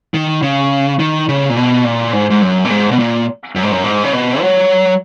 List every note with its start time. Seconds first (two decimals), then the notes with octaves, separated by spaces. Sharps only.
0.14 D#3
0.42 C#3
0.99 D#3
1.29 C#3
1.50 A#2
1.56 B2
1.85 A#2
2.13 G#2
2.30 G#2
2.42 F#2
2.65 A#2
2.70 G#2
2.91 B2
2.99 A#2
3.55 F#2
3.63 G#2
3.71 F#2
3.84 G#2
4.04 C#3
4.13 B2
4.41 F#3